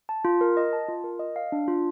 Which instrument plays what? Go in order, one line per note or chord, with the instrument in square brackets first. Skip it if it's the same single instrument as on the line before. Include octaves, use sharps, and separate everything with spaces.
[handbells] A5
F4
A#4
D#5
A5
F4
A#4
D#5
F5
D4
F4